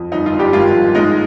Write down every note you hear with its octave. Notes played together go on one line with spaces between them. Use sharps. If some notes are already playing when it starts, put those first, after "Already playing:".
Already playing: F2
G1 D#4
F4
G1
G3 G4
G#1 F4
F3
G#3 D#4